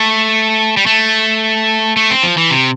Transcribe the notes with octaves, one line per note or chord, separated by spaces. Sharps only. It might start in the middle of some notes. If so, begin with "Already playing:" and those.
Already playing: A3
G3
A3
A3
C4
F3
E3
C3